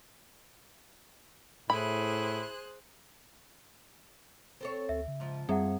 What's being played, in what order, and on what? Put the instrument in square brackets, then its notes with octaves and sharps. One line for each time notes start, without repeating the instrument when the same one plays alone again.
[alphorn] A2 [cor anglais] E4 [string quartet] G#4 C5 F#6 [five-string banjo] B5
[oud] C4 A4 C#5
[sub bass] D2 [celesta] E5
[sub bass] C#3
[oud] G#2 F3
[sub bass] F#2 [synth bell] G3 C4 [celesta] G#4 E5 F#5